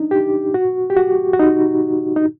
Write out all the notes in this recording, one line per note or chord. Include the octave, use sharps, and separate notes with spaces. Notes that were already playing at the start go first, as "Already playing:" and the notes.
Already playing: D4 D#4
G4
F#4
G4
F#4
F#4
D#4
D#4